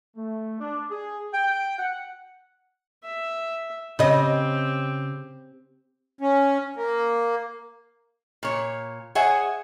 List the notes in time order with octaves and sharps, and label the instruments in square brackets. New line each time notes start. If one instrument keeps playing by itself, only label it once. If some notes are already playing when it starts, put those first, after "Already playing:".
[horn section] A3
D4
G#4
G5
F#5
[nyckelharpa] E5
[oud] C#3 D#5 [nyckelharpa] C4 G4
[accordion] C#4
A#3
[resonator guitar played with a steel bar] A#2 C#5
G#4 C#5 E5 F#5 G#5